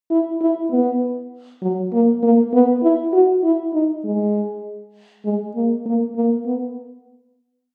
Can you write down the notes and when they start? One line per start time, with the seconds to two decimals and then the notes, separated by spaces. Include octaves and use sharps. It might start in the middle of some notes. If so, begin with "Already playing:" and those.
0.11 E4
0.41 E4
0.72 B3
1.62 F#3
1.93 A#3
2.23 A#3
2.53 B3
2.83 E4
3.13 F#4
3.44 E4
3.74 D#4
4.05 G#3
5.25 G#3
5.56 A#3
5.86 A#3
6.16 A#3
6.46 B3